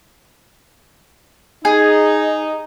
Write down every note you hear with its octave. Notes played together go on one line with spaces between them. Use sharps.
D#4 G#4